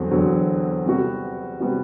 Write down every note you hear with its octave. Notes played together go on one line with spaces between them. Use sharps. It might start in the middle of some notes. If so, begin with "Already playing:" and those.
Already playing: E2 D3 F#3 C4
E2 D3 F#3 C4
C3 G3 B3 F#4
C3 G3 B3 F#4